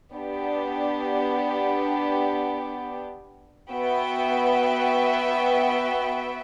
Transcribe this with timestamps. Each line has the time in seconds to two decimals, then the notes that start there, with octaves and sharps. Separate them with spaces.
0.12 B3 D4 G4
3.71 B3 F#4 B4 E5 G5